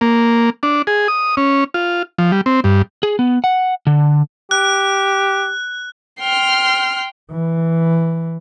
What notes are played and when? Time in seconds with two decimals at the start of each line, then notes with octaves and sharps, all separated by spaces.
0.01 A#3
0.63 D4
0.87 G#4
1.08 D#6
1.37 C#4
1.74 F4
2.18 F3
2.32 G3
2.46 C4
2.64 G2
3.03 G#4
3.19 B3
3.44 F#5
3.87 D3
4.51 G4 F#6
6.21 G5 C6 F6
7.31 E3